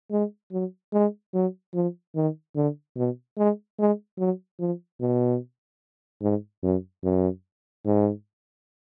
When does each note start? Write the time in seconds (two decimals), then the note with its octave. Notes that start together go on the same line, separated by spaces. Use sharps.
0.11 G#3
0.52 F#3
0.93 G#3
1.34 F#3
1.74 F3
2.15 D#3
2.55 D3
2.96 B2
3.37 G#3
3.79 G#3
4.18 F#3
4.59 F3
5.00 B2
6.22 G#2
6.63 F#2
7.04 F#2
7.85 G#2